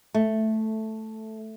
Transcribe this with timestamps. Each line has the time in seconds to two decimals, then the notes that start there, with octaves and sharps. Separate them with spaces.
0.14 A3